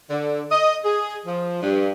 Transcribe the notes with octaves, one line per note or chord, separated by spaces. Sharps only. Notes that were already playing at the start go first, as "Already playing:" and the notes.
D3
D#5
G#4
F3
G2